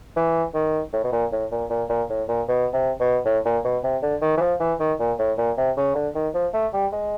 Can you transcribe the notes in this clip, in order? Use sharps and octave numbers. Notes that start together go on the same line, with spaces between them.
E3
D#3
A2
B2
A#2
A2
A#2
A#2
A#2
A2
A#2
B2
C3
B2
A2
A#2
B2
C3
D3
D#3
E3
F3
E3
D#3
A#2
A2
A#2
C3
C#3
D3
D#3
F3
A3
G3
G#3